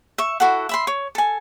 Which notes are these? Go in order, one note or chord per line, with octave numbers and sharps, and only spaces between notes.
E5 C#6
E4 F#4 A4 F#5
E5 B5 C6
C#5
A4 G#5